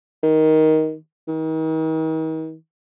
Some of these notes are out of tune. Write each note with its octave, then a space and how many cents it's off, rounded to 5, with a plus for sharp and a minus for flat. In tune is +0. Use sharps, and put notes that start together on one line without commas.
D#3 +10
D#3 +40